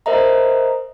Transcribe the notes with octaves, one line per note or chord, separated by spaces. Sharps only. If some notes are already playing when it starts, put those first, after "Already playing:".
A#4 C5 D#5 E5 A#5